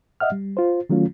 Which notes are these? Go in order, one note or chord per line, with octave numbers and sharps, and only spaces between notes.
D#5 E5 F#5 F6
G3
F4 C5
D#3 F#3 A3 C#4 F4